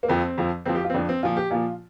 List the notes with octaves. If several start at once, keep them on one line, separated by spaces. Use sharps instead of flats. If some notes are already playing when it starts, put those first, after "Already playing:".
A#3
F2 F3 C4
F2 F3
F2 F3 C4
G4
F4
C4
F2 F3 D4
C4
A#2 F3 F4
G4
A#2 F3 F4